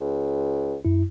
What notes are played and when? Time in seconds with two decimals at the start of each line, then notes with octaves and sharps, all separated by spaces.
0.01 C#2
0.85 F#2 E4